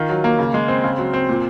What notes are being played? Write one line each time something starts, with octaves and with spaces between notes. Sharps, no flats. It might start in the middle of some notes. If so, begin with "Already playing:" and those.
Already playing: D#3 F4
F#3
A#3
C#3
G#3
C4
C#3
F#3
C4
A#2